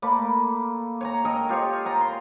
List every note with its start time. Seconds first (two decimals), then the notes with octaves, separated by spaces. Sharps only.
0.02 A3 A#3 D5 B5
1.01 C#5 G#5 A#5
1.25 A4 A#4 D#5 G5
1.49 F4 G4 C#5 D#5
1.85 A#4 G#5 A#5
2.01 C6